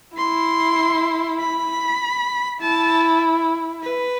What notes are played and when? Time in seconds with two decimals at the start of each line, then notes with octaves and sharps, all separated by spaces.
0.17 E4 C6
1.39 B5
2.61 E4 A5
3.83 B4